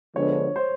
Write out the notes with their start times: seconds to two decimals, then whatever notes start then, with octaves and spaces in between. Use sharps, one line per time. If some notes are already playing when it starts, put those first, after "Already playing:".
0.16 D3 F3 G#3 B3 D4 C#5
0.56 C5